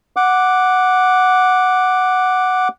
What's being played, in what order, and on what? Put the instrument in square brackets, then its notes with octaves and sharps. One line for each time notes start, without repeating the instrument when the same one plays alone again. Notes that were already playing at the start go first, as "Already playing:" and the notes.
[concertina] F#5 D6